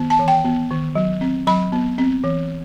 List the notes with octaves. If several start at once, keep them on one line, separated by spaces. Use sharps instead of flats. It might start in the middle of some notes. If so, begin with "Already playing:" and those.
Already playing: D#3 B3
A5
E3
G5
B3
D#3
F#3
C4
F#3 B5
B3
C4
E3